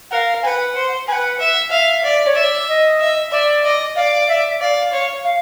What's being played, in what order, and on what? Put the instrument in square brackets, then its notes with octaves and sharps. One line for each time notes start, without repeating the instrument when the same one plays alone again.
[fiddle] A#4 [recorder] F5 F#5
[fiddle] B4 [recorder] F#5 G#5
[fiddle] C5
[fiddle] B4 [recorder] G#5
[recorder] F#5
[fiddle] E5
[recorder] E5 [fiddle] F5
[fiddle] D5
[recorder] C#5
[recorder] D5 [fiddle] E5
[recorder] D#5
[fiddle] E5
[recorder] D5 [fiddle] E5
[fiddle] D#5
[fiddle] D5 [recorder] F5
[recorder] E5
[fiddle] D5 [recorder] F5
[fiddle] C#5
[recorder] F5